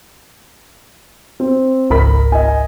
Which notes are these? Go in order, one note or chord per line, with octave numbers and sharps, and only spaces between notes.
C4
G#1 C#2 G#2 A#4 B5 B6
D#5 G#5